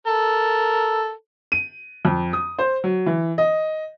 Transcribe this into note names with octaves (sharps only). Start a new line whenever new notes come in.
A4 A#4
D#7
F2
D#6
C5
F#3
E3
D#5